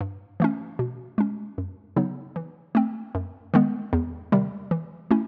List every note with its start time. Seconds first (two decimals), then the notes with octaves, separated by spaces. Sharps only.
0.01 G2
0.40 E3 A3 C#4
0.79 B2
1.18 G#3 C#4
1.58 F#2
1.96 C#3 F#3 B3 D#4
2.36 E3
2.75 A3 C4
3.15 F#2
3.54 D#3 G#3 B3
3.93 E2
4.32 C3 D#3 G3
4.71 E3
5.11 A3 C#4 E4